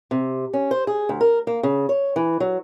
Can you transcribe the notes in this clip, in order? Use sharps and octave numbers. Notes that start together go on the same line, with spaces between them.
C3
C#4
C5
G#4
D2
A#4
A#3
C#3
C#5
E3
F#3